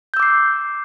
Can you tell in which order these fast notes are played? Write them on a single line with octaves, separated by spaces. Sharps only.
G6 E6 D6 C7